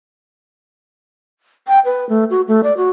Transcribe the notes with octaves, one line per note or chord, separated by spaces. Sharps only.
G5
B4
A3
F#4
A3
D5
F#4